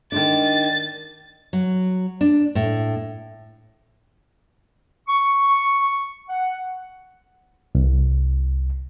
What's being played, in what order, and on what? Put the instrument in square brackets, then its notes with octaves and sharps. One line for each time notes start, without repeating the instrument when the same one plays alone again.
[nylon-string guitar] D#3 G#3 D4 [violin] A6
[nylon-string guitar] F#3
D4
A2
[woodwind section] C#6
F#5
[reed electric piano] C2